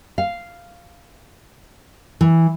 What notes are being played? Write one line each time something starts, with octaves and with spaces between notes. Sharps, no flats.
F5
E3